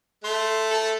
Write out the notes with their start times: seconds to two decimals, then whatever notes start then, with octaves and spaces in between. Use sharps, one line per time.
0.24 A3 C6
0.71 A4